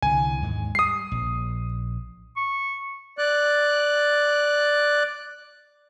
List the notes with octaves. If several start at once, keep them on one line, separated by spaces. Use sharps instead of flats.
C2 D3 E3 G#5
D#2 G#2 G#3
G3 D#6 C7
A#1
C#6
D5 F#6